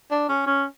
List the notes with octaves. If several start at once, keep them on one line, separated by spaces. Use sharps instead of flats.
D4
C#4
C#4